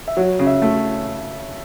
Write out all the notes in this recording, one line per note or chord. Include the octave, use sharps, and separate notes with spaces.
E5
F#3 C#5
C#3
E5
A3